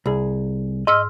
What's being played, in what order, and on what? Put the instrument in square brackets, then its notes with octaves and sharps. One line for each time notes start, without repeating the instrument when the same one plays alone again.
[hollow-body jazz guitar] C2 G#4
[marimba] G#2 E6 F6 [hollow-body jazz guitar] D#5